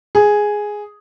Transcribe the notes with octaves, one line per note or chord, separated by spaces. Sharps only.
G#4